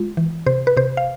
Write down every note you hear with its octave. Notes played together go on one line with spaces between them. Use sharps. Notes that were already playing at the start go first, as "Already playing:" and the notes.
Already playing: G#3 F4
E3
C3 C5
B4
C3 C5
F5